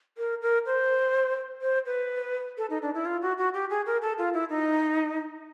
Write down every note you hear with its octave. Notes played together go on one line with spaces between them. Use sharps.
A#4
A#4
C5
C5
B4
A4
D#4
D4
E4
F4
F#4
F#4
G4
G#4
A#4
A4
F4
E4
D#4